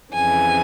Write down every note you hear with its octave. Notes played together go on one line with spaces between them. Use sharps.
F2 C#3 E3 G#5